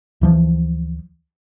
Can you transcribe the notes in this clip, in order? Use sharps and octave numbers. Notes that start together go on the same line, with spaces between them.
D2 E3 F3